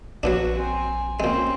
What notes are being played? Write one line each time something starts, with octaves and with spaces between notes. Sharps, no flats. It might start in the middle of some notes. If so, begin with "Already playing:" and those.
A#1 F#3 B3 D4 F#4
C4 G#5
A#2 G#3 C4 C#4